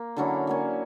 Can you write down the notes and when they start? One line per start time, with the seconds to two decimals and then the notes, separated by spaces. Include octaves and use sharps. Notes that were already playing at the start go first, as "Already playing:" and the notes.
Already playing: A#3
0.16 D3 F#3 C#4 E4
0.47 F#3 A#3 C#4